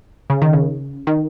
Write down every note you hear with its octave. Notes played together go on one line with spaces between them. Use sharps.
C#3
D#3
C#3
D#3